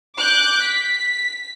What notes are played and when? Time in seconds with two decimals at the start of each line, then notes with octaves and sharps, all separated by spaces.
0.18 D6 F#6 G6
0.62 B6